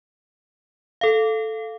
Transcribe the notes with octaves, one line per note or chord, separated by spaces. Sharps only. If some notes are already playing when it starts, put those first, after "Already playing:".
A4 F5